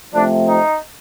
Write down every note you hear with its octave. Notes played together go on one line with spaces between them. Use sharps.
C3 F3 A3 D4
D#4